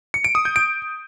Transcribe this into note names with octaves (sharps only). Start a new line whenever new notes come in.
C#7
D7
D#6
G6
D7